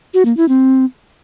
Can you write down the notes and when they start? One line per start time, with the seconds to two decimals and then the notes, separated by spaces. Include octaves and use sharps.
0.14 F#4
0.25 A#3
0.37 E4
0.48 C4